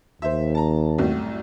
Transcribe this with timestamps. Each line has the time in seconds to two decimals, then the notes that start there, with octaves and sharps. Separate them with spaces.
0.22 D#2 C5 E5
0.55 A5 A#5
0.98 C2 F#2 A2